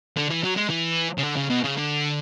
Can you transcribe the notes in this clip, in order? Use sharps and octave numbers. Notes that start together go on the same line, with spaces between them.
D3
E3
F#3
G#3
E3
C#3
D3
C#3
B2
C#3
D3